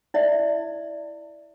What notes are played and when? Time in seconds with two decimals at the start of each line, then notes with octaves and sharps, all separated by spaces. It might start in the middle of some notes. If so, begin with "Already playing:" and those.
0.14 E4 D5 E5